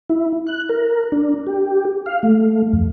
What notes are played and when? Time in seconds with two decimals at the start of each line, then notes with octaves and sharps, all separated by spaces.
0.10 E4
0.47 F#6
0.69 A#4
1.12 D4
1.47 G4
2.06 F5
2.23 A3
2.73 F2